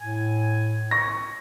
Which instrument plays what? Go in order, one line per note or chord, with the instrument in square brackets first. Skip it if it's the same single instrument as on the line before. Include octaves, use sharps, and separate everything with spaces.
[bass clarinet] A2 [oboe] G#5
[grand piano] C#6 A#6